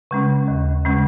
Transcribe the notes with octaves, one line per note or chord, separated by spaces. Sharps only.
C#3 G#3 C#4
D#2
C#3 G#3 C#4